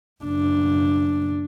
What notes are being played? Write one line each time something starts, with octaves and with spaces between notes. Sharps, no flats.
F#1 D4